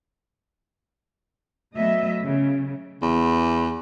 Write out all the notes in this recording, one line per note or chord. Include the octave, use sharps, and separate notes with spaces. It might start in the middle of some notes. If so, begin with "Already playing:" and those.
F#3 A3 B3 D#5 E5
C#3
E2